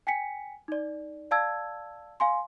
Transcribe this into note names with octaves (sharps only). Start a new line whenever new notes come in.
G5 G#5 B6 C#7
D#4 D5
D5 F5 A5 E6 G#6
F5 G#5 C6